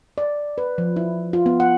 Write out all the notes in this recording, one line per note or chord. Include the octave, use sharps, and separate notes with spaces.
D5
B4
F3
E4
F4
B3
F#5